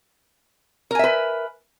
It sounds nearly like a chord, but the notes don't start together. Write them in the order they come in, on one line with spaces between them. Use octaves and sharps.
A#4 G#5 E5 B4